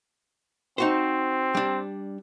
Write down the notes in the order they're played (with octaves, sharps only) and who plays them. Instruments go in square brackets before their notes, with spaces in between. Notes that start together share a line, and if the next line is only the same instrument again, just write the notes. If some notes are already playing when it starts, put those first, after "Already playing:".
[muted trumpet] C4 [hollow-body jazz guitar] D#4 F#4 C5
[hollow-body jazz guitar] G3 D4